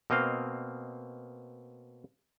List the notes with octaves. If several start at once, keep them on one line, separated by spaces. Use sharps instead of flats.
B2 A#3 C4 D#5 F5